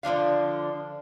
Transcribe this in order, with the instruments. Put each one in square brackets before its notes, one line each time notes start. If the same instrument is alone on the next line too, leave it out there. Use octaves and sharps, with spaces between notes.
[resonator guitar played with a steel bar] D3 F3 D4 F5